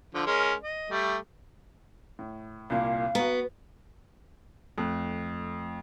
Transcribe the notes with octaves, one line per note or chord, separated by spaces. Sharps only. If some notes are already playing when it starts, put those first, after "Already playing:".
D3 F3
G#3 C#4 A#4
D#5
G3 A3
A2
C2 A#2 A#3 F5
B3 F#4 A#5
F2 A3 F#6